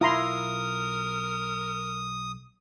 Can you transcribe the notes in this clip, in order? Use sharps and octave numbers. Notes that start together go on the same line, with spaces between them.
B1 E4 F4 A#4 A#5 C6 D#6